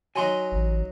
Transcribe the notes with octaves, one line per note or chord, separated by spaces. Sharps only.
F#3 D#4 G#5 C6
A1